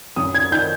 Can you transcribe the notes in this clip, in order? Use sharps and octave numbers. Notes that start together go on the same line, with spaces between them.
F#2 D#6
G#6
D#3 G6